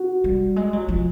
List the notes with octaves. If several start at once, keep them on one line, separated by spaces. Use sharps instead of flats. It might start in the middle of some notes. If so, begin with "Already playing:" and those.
Already playing: F#4
G3
G#3
F#3
F3